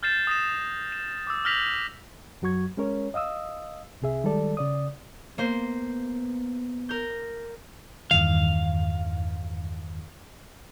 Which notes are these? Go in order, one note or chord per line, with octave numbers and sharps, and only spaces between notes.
F6 G6 A6 C7 E7
D#6 A#6 E7
D#6
E7
D6 E6
F6 G6 A#6 B6 F7 F#7
F#2 F#3 F#4 C#6 G#6
G#3 C#4 A#4 C#5
D#5 F5 D#6 E6
C2 C3 G#4 E5
D#3 G3 G#3 A4 D5
C#3 D5 D#6
A#3 B3 C5
A#4 G6
E2 G2 D#3 F5